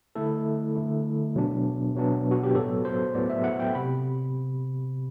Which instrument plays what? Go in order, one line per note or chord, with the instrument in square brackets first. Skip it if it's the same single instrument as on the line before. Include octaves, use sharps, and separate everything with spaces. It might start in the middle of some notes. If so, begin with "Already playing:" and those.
[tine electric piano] D3 A3 E4 A4
D3 A3 E4
B2 F#3 B3 D4
B2 F#3 B3 D4
F#4
G4
A2 F#3 B3 A4
C5
A2 F#3 B3 D5
E5
F#5
G5
C3 B5